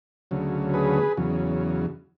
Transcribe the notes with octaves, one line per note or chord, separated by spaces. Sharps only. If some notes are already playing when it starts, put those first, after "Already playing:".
D2 C#3 F#3
G#4 B4
E2 C#3 F#3